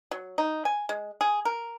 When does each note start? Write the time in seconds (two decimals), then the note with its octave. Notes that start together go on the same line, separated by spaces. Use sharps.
0.11 F#3
0.38 D#4
0.65 G#5
0.89 G#3
1.21 G#4
1.45 A#4